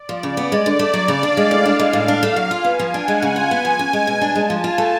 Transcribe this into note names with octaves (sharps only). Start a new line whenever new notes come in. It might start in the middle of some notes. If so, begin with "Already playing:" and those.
Already playing: D5
F3
C#3
B3
G#3
D3
A3 D5
F#3
C#3
D4 F5
G#3
A2
D4 F5
G#3
A2
D4
A3
F#3
F4 G#5
B3
F3
D4 F#5
G#3
C#3
F4 G#5
B3
F3
C#4
G#3
B2
D4 A5
G#3
F3
F4 G#5
A3